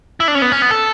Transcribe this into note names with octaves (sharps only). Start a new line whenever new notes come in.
E4
D4
C#4
B3
C#4
B3
A4